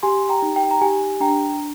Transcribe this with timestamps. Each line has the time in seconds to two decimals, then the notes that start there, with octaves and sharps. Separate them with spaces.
0.03 G4 G#5 C6
0.29 G5 A#5
0.42 D#4
0.56 G5
0.71 A#5
0.82 G4 G#5
1.20 D4 G5 A#5